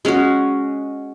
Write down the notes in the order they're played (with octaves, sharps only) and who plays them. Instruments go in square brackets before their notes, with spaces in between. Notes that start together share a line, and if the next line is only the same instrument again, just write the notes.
[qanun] G#3 C#4 F#4